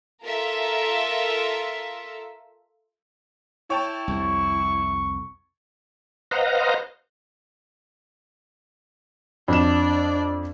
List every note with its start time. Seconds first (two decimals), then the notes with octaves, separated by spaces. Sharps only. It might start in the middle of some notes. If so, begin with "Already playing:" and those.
0.24 F4 A4 A#4 E5
3.70 E4 C#5 G5 A5
4.08 C2 F2 C#6
6.31 B4 C5 D#5 F5 F#5 A#5
9.48 F2 D4 D5 E7